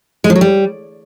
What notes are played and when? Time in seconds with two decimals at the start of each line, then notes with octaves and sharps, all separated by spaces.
0.24 G#3
0.30 F3
0.36 F#3
0.41 G3